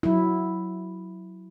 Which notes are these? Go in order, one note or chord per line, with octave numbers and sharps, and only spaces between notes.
F#3 E4